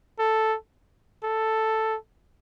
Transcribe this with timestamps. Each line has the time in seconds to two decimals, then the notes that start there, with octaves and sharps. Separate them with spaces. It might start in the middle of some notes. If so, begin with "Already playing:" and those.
0.19 A4
1.24 A4